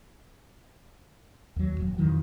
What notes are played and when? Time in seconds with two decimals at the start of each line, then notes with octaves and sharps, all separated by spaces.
1.56 D#2 F#3
1.79 D#1 F#2
1.98 F2 D#3 E3 F#3